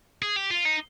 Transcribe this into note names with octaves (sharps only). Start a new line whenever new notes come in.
G#4
G4
F4
D#4